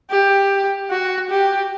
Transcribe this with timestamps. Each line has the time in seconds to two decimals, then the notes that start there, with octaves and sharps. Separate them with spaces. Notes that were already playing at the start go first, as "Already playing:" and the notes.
0.10 G4
0.90 F#4
1.30 G4